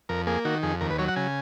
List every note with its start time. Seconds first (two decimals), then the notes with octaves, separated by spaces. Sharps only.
0.09 F2 A#4
0.27 A#3 G#4
0.45 D#3 F#4
0.63 F2 G#4
0.81 D#2 A#4
0.90 B4
0.98 F#3 C#5
1.08 F#5
1.16 C#3 G#5